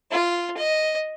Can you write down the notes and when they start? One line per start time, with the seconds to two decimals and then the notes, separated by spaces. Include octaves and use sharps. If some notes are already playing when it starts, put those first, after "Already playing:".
0.11 F4
0.57 D#5